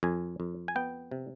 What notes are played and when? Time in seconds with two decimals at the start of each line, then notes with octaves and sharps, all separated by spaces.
0.03 F2 G#5
0.40 F2
0.68 G#5
0.76 B3 G5
1.11 C3